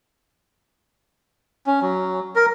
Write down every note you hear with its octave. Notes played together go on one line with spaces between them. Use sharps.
C#4
F#3
A#4